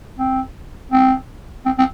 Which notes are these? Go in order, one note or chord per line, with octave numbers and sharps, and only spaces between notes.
C4
C4
C4
C4